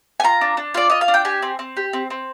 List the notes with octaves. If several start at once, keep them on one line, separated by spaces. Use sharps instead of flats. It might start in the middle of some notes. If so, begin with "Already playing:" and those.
G#5
F4 A#5
D4
D4
F4 D5
F4 D#5
F5
D4
G5
G4 G#5
C4
C4
G4
C4
C4